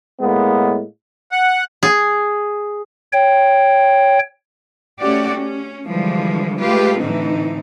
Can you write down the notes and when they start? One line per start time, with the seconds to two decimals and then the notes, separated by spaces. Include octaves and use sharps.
0.20 A2 G#3 A#3 B3
1.32 F#5
1.83 G#4
3.13 C#5 G5
4.99 A3 C#4 F#4 G4 D5
5.34 C#4
5.87 D3 E3 F3 G3 G#3
6.61 G#3 A3 F4 G4 B4
7.00 A2 D3 E3 C4 D#4